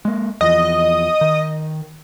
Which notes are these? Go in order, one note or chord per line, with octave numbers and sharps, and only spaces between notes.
G#3 A#3
E2 E3 F3 D#5
D#3